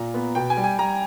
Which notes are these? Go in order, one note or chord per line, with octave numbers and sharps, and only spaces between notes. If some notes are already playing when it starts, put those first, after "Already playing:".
Already playing: A#2 A#5
B3
B2 G5
G#5
G3
G#5
G3 A#5